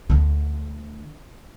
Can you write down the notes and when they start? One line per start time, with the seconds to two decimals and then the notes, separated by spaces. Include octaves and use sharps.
0.10 D2 D3